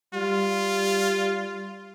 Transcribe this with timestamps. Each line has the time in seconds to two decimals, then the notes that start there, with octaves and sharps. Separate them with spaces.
0.14 G3 F4